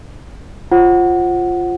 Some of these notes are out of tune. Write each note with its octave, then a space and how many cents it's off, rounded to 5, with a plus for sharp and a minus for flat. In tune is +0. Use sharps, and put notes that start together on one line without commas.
F4 +0 C5 +25 F#5 +0